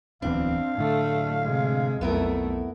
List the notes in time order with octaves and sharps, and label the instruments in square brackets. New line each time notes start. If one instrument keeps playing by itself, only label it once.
[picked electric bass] D1 E2 E3 [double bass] C4 [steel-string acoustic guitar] D4 [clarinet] F5
[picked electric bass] A2 D3 [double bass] A3
[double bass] C3 G#3
[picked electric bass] B1 [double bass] F2 A3 [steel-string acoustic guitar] B3 E4 A#4